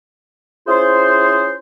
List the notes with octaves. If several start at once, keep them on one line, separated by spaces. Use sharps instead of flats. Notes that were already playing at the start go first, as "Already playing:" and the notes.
C#4 E4 F4 G#4 C5